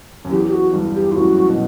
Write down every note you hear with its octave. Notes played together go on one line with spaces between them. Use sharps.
F#2
E2 G4
G4
F#4
E2 G2
G4
E4
F#2 A2 F#4
B2